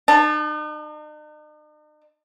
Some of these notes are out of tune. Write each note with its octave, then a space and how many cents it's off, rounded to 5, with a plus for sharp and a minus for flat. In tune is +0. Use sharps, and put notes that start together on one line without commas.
D#4 -45 A5 +0